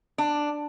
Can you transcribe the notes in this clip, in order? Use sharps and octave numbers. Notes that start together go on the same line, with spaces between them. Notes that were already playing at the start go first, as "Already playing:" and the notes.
D4